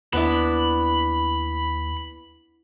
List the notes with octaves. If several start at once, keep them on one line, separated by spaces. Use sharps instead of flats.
D#2 B3 D4 E4 B5